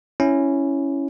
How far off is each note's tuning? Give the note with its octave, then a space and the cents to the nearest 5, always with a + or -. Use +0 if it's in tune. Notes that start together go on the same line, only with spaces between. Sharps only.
C#4 +0 E4 +0